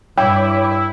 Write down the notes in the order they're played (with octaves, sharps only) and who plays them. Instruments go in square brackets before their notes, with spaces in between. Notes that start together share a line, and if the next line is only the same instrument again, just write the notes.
[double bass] G2 [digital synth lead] E4 [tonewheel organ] C#5 B5 D6 [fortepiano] G5